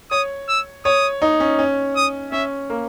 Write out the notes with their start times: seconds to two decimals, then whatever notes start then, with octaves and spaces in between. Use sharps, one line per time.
0.11 C#5 D#6
0.49 E6
0.85 C#5 D#6
1.22 D#4
1.40 C#4
1.59 C#4
1.96 D#6
2.32 C#4 E5
2.70 A#3